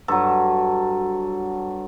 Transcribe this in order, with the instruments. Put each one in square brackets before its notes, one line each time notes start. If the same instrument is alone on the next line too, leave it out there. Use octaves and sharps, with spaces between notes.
[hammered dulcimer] G2 F#3 A4